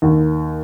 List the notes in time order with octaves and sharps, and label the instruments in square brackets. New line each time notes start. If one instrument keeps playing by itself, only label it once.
[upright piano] D#2